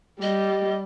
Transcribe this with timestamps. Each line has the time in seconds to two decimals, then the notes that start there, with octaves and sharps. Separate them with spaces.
0.22 G3 D#5